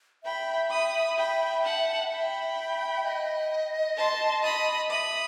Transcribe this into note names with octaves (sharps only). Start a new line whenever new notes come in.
E5 G5 B5
B5 D#6
G5 B5
F#5 A5
G5 B5
D#5
A5 C6
B5 D#6
E5 B5 D#6